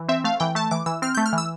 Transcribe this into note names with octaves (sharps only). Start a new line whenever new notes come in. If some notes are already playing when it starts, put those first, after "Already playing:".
Already playing: E3
C4 E5
A3 F5
E3 G5
A3 A5
E3 D6
E3 E6
C4 F6
A3 G6
F6
E3 E6